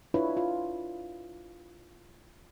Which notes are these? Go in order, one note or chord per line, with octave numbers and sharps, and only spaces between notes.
D4 E4 F4 B4 C#5
F4